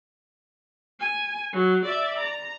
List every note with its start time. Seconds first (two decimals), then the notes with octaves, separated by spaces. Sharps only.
1.00 G#5
1.53 F#3
1.85 D5 E5
2.19 A#5